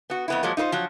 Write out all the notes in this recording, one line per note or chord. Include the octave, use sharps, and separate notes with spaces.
B3 F#4
F2 B3 E4
F3 F#3 G#3 A#3
D#4 F4 B4 C5
F3 F#3 F#4